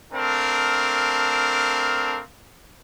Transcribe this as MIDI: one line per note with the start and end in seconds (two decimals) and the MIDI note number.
0.12 2.20 57
0.12 2.20 60
0.12 2.20 62
0.12 2.20 70
0.12 2.20 77